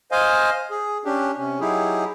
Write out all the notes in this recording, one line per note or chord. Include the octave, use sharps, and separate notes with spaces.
C5 D#5 F5 G#5
G#4
C#4 D4 G4
C3 C#4
F#3 D#4 E4 G4 G#4